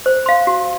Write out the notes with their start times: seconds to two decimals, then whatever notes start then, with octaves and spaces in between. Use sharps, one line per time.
0.06 C5
0.26 F5 C6
0.47 F#4